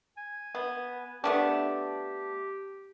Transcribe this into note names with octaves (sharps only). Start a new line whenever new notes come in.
G#5
B3
A3 B3 D4 G4